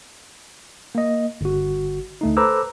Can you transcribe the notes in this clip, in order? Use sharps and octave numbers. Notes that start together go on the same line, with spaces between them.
A#3 D#5
G1 F#4
D2 A3 D#4
A4 B4 C5 A#5 D6 E6